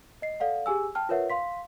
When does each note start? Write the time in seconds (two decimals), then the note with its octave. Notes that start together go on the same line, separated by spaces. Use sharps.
0.22 D#5 C7
0.40 A4 D5 F5 F#5
0.66 G4 G#4 G#5 E6
0.95 G5 A5 F6
1.09 F4 A#4 B4 C#5 E5 F#5
1.30 F5 C6 B6